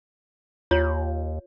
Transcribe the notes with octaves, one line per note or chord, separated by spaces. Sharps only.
D#2 F4 C#5